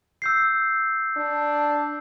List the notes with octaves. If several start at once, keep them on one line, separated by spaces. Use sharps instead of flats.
E6 G6 C7
D4